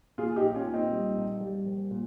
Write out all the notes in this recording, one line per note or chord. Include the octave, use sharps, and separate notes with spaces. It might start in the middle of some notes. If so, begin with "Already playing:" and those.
A#2 F4 G#4
D#4 G4
A#1
C#4 F4
A#2
C4 D#4
G3
A#1
G3
A#1
A#2